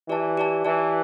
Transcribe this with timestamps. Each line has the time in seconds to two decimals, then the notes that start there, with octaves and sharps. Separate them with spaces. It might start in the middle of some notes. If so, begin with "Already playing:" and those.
0.08 E3 G4 D5 A5
0.37 G4 D5 A5
0.65 E3 G4 D5 A5